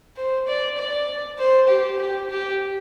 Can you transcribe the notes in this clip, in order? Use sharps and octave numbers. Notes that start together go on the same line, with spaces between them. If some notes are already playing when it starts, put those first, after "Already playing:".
C5
D5
D5
C5
G4
G4
G4